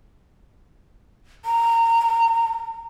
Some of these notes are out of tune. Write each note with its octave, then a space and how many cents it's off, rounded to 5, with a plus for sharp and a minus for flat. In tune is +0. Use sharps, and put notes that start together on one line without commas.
A#5 -25